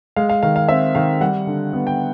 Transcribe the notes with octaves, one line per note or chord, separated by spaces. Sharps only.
G#3 F5
F5
D#3 F5
F5
C4 E5
D#3 F5
G3 F#5
D3
B3
G5